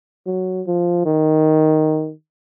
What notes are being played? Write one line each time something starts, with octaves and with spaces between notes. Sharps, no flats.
F#3
F3
D#3